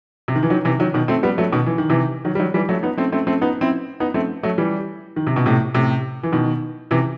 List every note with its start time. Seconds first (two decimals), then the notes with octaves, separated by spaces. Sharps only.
0.28 C3
0.35 D#3
0.43 E3
0.50 D#3 F#3
0.65 C3 E3
0.80 D#3 F#3
0.94 B2 D#3
1.08 A3 C4
1.23 G3 B3
1.38 F#3 A3
1.53 B2 D#3
1.66 E3
1.78 D#3
1.90 C3 E3
2.25 D#3 F#3
2.35 G3
2.39 D#3 F#3
2.54 E3 G3
2.69 F#3 A3
2.83 B3 D#4
2.97 A3 C4
3.12 A3 C4
3.27 A3 C4
3.41 B3 D#4
3.61 C4 E4
4.00 B3 D#4
4.14 A3 C4
4.43 F#3 A3
4.58 E3 G3
5.16 D#3
5.27 C3
5.36 B2
5.46 A2 C3
5.74 A2 C3
6.23 E3
6.32 B2 D#3
6.91 C3 E3